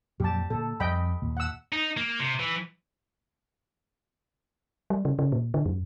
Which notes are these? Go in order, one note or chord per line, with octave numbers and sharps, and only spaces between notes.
F2 A#2 F#3 G4 A5
A#2 D3 A#3 A4
F2 G3 D#5 G5 B5
D#2 A#2
F#5 E6
D#4
A#3
C3
E3
G3
C#3
C#3
A#2
D3
F#2